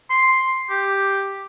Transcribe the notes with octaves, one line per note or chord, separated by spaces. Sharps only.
C6
G4